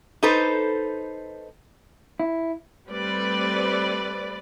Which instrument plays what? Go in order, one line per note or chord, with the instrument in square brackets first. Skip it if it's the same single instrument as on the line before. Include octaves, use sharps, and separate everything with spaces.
[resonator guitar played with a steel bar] D#4 A4 B4 C5
[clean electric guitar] E4
[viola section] G3 A3 C4 B4 D5